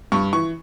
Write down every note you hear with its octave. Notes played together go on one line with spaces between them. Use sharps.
G2 C#6
E3 C#6